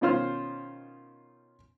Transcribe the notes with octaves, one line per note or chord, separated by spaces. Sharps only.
B2 D#3 C#4 F4 C5 F6